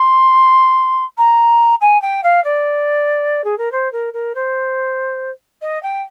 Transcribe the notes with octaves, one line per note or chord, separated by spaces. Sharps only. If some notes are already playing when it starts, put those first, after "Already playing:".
Already playing: C6
A#5
G#5
G5
F5
D5
G#4
A#4
C5
A#4
A#4
C5
D#5
G5